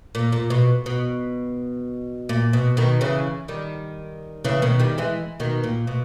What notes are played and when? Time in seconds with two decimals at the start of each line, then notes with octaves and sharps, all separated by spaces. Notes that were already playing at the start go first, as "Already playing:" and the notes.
0.15 A#2
0.32 A#2
0.50 B2
0.86 B2
2.29 A#2
2.53 B2
2.77 B2 D#3
3.01 C#3 E3
3.48 D#3 G3
4.44 C#3 E3
4.62 B2 D#3
4.79 D#3 G3
4.98 E3 G#3
5.40 B2 D#3
5.64 A#2
5.87 B2